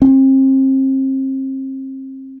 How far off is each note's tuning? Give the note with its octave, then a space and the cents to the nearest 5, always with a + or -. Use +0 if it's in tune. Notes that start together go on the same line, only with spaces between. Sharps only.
C4 +35